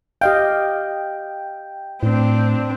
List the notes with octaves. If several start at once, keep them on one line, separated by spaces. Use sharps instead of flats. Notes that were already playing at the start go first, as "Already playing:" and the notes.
G4 D#5 F5 G5
A2 C4 D4